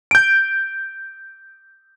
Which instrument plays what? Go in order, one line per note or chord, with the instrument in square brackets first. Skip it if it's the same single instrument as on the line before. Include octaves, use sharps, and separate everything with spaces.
[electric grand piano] G6 D7